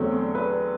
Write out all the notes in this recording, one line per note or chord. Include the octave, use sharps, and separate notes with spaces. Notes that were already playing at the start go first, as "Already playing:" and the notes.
Already playing: E2 D3 F#3 A3 C4
B4